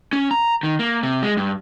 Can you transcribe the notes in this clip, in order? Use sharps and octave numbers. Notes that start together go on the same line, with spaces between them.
C#4
A#5
D#3
A#3
C3
G#3
G2